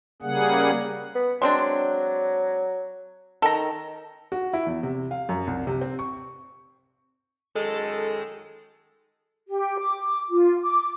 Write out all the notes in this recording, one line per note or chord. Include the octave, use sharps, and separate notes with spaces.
C#3 G3 A#3 G#4 F#5
B3
F#3 G#3 C4 D4
D#3 A4 A#5
F#4
E4
E2
C3
F5
F#2
C2
C3
C4
C#6
F#2 D#3 G#3 A4
G4
D6
F4
D6